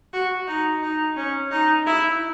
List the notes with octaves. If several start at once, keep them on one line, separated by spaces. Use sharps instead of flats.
F#4
D#4
D#4
C#4
D#4
E4